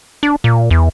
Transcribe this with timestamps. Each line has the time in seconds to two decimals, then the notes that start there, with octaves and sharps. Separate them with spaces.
0.23 D4
0.44 A#2
0.71 E2